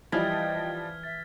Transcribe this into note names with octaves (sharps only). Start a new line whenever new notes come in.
E3 F3 G3 D#5 G5 F6 G#6 B6
E5 A6